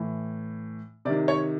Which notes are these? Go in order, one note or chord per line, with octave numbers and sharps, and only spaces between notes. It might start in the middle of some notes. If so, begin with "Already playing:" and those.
Already playing: A2 E3
C3 D#3 D5
C#5